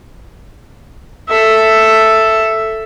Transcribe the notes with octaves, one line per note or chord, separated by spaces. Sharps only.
A4 E5